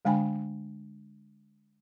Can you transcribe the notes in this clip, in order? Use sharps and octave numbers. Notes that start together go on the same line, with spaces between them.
D3 G#3 D4 G5 G#5 B5